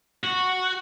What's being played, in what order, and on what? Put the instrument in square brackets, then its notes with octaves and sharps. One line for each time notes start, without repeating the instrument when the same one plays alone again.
[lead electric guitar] F#4